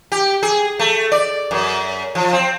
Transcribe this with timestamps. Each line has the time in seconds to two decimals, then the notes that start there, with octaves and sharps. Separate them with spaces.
0.12 G4
0.43 G#4
0.79 A3
1.12 D5
1.51 F#2
2.15 F3
2.33 C4